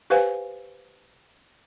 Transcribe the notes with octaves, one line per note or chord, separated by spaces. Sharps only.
G4 B4 C5 F5 F#5 G#5